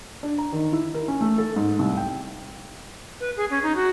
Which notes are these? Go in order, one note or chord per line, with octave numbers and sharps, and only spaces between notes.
D4
A#5
D#3
E4
A#4
C#4
A3
A4
G#2
C2
G5
B4
G#4
C#4
D#4
F#4